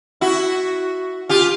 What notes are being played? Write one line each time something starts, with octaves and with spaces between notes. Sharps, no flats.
E4 F#4
F4 G4